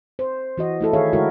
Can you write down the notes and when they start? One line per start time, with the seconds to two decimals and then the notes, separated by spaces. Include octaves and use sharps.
0.19 C5
0.58 E3 F#4 D#5
0.81 A3 E4 A4
0.93 D#3 G#4 C#5 E5 F5
1.13 D3 G#3 E4 F#4 A4 A#4